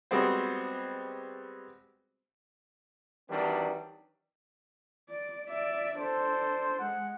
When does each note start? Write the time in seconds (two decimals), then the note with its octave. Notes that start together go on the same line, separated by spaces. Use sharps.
0.11 G3 G#3 B3 C4 F#4 C5
3.29 D#3 E3 F#3 G3 C4 D4
5.10 D5
5.46 D5 E5
5.97 D4 A4 C5
6.79 G#3 F#5